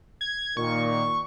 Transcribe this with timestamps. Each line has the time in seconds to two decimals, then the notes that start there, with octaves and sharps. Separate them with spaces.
0.21 G#6
0.57 A#2 D#3 C#6